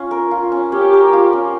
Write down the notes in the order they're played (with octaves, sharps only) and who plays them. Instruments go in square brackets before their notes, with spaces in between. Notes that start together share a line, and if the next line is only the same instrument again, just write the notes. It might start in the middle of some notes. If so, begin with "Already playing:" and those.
Already playing: [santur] C#4 F4
A#4
F4
C#4
[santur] C#4 [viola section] G4
[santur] A#4
F4
C#4